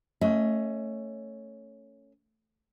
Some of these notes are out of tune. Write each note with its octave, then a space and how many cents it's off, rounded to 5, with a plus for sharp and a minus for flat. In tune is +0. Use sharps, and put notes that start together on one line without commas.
A3 +20 C#4 +0 D#5 +30